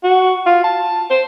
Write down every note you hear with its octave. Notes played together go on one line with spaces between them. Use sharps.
F#4
F4
A5
C5